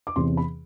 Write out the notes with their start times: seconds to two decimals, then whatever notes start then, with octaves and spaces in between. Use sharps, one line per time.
0.07 D6
0.16 E2 C3 E3 C6
0.37 B5